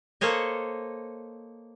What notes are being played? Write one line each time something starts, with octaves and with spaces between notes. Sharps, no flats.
A#3 A4 C5 C#5 D#5